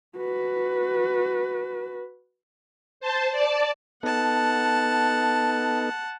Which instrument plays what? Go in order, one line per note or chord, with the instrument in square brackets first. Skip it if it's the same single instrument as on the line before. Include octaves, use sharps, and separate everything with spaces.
[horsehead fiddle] F#4 B4
[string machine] C5 A5
D5 A5
[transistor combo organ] B3 D#4 A4 [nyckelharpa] F#5 A5